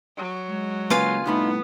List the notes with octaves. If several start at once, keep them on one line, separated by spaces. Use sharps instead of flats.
F#3
G#3
C#3 A#3 F4 B4 F5 G#5
C2 A2 B3 D#4 B5